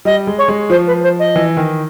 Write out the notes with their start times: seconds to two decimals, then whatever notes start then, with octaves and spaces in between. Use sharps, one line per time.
0.05 G3 D#5
0.27 G#3
0.38 C#5
0.48 G#3
0.70 F3 C5
0.87 B4
1.03 C5
1.19 D#5
1.36 E3
1.57 D#3